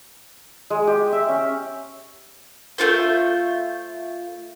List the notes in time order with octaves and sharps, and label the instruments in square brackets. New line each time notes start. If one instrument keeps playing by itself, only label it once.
[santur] G#3
G4
E5
C#4
[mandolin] A3 A#3 F4 C5